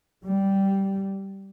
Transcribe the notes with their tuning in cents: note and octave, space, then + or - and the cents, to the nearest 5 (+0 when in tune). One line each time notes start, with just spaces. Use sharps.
G3 -10